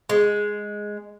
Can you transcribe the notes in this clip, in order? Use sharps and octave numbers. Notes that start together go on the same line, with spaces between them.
G#3